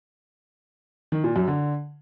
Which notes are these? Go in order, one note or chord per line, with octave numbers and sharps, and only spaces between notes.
D#3
A#2
F#2
D3